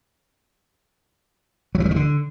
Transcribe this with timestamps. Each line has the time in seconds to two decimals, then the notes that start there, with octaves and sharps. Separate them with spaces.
1.75 F#3
1.80 E3
1.85 G3
1.91 D#3
1.96 D3